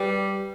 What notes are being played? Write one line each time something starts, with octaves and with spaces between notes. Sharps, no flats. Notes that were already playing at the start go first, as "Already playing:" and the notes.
Already playing: G3 B4 D5 G5 D6